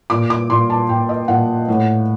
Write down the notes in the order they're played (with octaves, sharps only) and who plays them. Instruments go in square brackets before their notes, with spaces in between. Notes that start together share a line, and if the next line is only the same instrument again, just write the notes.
[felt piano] A#2 D6
D6
A#2 C6
A5
A#2 G5
D#5
A#2 F#5
A2